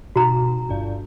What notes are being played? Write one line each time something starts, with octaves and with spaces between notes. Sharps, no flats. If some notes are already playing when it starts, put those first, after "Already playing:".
G#1 B2 F#4 A#5
G1 G2